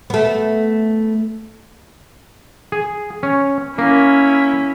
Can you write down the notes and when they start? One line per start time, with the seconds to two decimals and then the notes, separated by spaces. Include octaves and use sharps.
0.10 A3 B3
2.72 G#4
3.23 C#4
3.78 A#3 C#4 E4